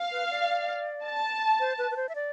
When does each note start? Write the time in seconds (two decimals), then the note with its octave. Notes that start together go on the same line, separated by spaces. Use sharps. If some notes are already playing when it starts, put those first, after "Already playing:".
Already playing: F5
0.11 B4
0.30 D5
1.04 A5
1.60 C5
1.78 B4
1.91 B4
1.96 C5
2.09 E5
2.15 D5